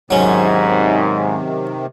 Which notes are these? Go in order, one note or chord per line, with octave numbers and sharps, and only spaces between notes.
G#2 C3 D#3 F#3 C#4